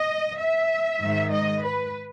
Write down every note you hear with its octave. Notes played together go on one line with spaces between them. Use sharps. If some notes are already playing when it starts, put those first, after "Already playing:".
Already playing: D#5
E5
G#2 D#3
D#5
B4